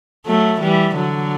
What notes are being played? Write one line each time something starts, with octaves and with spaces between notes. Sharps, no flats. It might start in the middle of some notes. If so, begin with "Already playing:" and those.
F#3 A3
E3 G3
D3 F#3